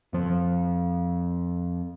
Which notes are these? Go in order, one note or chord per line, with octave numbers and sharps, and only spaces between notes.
F2 F3